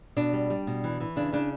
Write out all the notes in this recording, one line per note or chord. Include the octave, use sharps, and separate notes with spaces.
B2 D4
G3
G3
B2
E3
E3
C#3 D4
C#3 D4